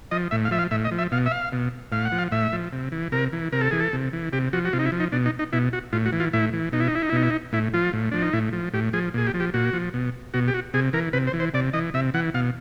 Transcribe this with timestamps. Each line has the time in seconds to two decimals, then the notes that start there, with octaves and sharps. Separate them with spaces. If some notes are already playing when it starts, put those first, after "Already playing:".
0.11 F3 D#5
0.31 A2 E5
0.45 F5
0.51 F3 E5
0.59 F5
0.71 A2 E5
0.85 D#5
0.91 F3
0.98 E5
1.12 B2 F5
1.26 E5
1.31 F5
1.52 B2
1.92 A2 F5
2.05 F#5
2.12 F3
2.19 F5
2.32 A2 E5
2.53 F3
2.73 C3
2.92 E3
3.12 C3 A#4
3.32 E3
3.52 C3 A#4
3.61 A4
3.71 E3 G#4
3.80 A4
3.93 C3
4.13 E3
4.33 C3 G4
4.53 F3 F#4
4.65 F#4
4.73 C3 F4
4.79 D#4
4.86 E4
4.92 F3
5.00 D#4
5.12 B2 D4
5.26 D#4
5.39 D#4
5.53 B2 E4
5.73 F#4
5.93 A2 F4
6.06 F#4
6.13 E3
6.20 F4
6.33 A2 E4
6.53 E3
6.72 B2 D#4
6.80 E4
6.88 D#4
6.95 E4
7.02 D#4
7.09 E4
7.13 B2 D#4
7.23 E4
7.30 D#4
7.52 A2 E4
7.74 F3 F4
7.93 A2
8.11 F3 D4
8.22 D#4
8.33 A2 E4
8.53 F3
8.73 A2 G4
8.93 F3 G#4
9.14 A#2 G#4
9.27 G4
9.34 F3
9.40 G4
9.54 A#2 F#4
9.73 F3
9.94 B2
10.34 B2 F#4
10.48 G4
10.54 F#4
10.74 C3 G#4
10.93 E3 A#4
11.13 C3 B4
11.27 C5
11.33 E3
11.40 C5
11.54 C3 D5
11.73 E3 D#5
11.94 C3 E5
12.14 E3 F#5
12.34 B2 F5